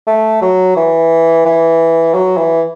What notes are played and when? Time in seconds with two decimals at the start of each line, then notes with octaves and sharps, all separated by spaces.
0.07 A3
0.42 F#3
0.76 E3
1.45 E3
2.14 F#3
2.38 E3